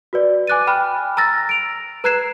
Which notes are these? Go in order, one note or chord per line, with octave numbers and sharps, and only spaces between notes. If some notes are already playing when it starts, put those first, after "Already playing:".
F#4 B4 D5
G#5 D6 F#6 A6 D#7
G5 G#5 B5 F6 F#6
A#5 E6 F6 A6 A#6
D7 F7
B4 A#5 F#6 G#6 C7 E7